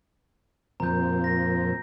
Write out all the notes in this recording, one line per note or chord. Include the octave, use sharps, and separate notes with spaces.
F2 A#2 C4 A#5 G6
A#6